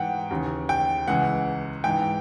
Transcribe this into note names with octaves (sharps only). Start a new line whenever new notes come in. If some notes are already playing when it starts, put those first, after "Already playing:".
Already playing: G#2 E3 F#5 G5
D#2 C#3 E3
G5
C#2 C#3 E3 F#5
G#2 E3 G5